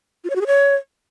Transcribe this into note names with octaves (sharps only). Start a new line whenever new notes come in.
F4
C#5
F#4
G#4
C#5